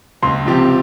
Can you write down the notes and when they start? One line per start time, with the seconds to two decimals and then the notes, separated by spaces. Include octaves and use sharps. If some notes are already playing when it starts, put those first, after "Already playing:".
0.22 C#2 C6
0.46 C3 F3 C4 G4